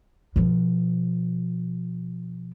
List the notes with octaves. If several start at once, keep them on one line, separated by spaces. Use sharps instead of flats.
B2 F3